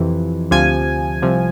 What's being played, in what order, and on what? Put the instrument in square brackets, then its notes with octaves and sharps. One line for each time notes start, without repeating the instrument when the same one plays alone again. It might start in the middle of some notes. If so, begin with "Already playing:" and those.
Already playing: [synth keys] F2 C3 E3
D2 C3 F3 G#5
C2 C3 F3